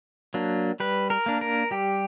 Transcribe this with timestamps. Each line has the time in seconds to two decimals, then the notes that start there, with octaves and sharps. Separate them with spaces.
0.34 F#3 A#3 D4
0.80 G3 B4
1.10 A#4
1.26 A#3 D4
1.41 A#4
1.71 G3 G4